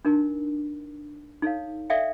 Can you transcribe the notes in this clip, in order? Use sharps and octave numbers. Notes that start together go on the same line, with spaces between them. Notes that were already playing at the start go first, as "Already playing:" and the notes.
D4 D#4 A#4
D#4 A4 C#5 F5
A4 D5 E5 F5 G5